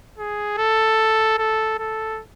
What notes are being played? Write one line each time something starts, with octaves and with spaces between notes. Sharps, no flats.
G#4
A4
A4
A4